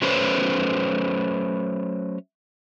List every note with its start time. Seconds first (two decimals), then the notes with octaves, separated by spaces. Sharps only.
0.02 F#3 A3 C#4 B4 C5